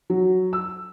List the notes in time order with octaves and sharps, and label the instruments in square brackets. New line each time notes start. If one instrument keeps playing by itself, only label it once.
[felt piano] F#3
E6